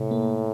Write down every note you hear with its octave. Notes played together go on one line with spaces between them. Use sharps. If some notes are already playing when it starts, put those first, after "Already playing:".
Already playing: A2 C3
A#3